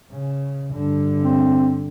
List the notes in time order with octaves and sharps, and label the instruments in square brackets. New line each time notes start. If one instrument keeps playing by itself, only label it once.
[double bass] C#3
G2 D3
[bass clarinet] C4